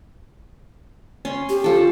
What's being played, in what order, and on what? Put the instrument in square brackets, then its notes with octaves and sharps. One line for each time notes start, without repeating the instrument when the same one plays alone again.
[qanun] C#4 C6
[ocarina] G4
[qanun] F3 A4